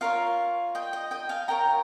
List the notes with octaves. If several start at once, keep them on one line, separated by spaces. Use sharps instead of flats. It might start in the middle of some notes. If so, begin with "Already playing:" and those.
F4 A#4 C#5 F5
D#5 G5
D#5
D#5 G5
F5 G#5
F4 A#4 C#5 G5 A#5